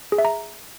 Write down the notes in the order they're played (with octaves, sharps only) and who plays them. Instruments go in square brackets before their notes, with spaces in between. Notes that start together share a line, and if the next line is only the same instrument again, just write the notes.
[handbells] G#4
E5
A#5